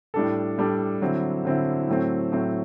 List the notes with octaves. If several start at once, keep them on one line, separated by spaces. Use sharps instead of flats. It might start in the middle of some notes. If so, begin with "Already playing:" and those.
A2 G3 D4 A4
A2 G3 D4 A4
D3 F#3 C4 E4
D3 F#3 C4 E4
A2 F#3 A3 C4
A2 F#3 A3 C4